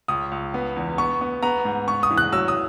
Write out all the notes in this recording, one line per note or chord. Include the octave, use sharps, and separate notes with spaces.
C#2 D#6
C#2
B3
E2
B3 C#6
B3
B3 A#5
G#2
B3 C#6
D#6
E3
F#6
F#3 E6
D#6